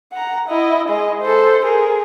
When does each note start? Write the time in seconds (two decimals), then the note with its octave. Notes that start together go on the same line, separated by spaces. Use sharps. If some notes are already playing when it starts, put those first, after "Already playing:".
0.13 F#5 A#5
0.48 E4 D#5
0.89 G#3 D#5
1.21 A4 C5
1.65 G#4 A#4